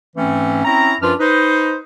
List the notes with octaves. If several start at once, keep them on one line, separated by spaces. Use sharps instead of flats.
G#2 E3 A3 C4 C#4
C4 C#4 E4 A#5
F#2 F3 D4 F4 B4 F6
D#4 B4 C5